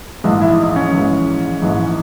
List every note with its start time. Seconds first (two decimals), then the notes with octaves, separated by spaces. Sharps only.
0.24 A#1 G#2 E3 G#3
0.41 E4
0.59 D#4
0.76 C#4
0.93 A#1 G#2 E3 G#3
1.62 A#1 G#2 E3 G#3